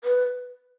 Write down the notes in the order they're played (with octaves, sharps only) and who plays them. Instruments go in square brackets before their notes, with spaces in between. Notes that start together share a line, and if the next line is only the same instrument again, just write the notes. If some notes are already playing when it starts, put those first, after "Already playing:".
[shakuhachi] B4